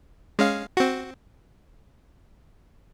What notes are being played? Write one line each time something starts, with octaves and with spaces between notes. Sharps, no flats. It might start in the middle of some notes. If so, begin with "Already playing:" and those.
G#3 C#4 F5
C4 F#4